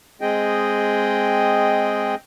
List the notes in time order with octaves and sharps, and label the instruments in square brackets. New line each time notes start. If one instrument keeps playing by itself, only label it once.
[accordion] G#3 C4 G#4 D#5 G5